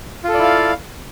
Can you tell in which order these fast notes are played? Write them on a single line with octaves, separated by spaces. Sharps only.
F4 A4 D5 E4 F5